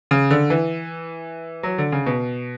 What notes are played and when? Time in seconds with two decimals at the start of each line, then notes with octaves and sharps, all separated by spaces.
0.11 C#3
0.31 D3
0.50 E3
1.63 F#3
1.78 D3
1.92 C#3
2.06 B2